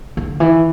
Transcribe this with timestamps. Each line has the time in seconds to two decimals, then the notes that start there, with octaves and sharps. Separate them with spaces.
0.17 D3
0.40 E3